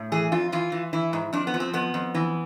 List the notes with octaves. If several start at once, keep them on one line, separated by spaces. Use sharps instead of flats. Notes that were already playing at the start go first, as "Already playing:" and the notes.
Already playing: A2
E3 G#4
F2 F4
E3 F4
E3
E3 E4
G#2
F2 D4
B3
F3
C4
F2 B3
F2
E3